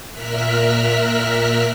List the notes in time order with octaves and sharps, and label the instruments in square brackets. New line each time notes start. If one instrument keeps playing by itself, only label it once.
[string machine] A#2 A#4 E5 F6 F#6 B6